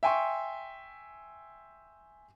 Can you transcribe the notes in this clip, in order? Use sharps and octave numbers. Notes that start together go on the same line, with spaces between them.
E5 G5 G#5 C6 C#6